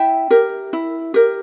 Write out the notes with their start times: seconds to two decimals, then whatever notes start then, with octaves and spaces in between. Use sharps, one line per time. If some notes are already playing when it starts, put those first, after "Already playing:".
Already playing: E4 E5 G5
0.30 G4 A#4
0.73 E4
1.14 G4 A#4